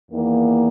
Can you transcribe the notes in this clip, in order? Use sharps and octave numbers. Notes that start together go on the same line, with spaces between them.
E2 D#3 A#3